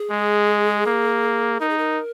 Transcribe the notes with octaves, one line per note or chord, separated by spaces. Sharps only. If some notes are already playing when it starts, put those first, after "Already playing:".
Already playing: G#4
G#3
A#3
D#4 A#4
G#4
A#4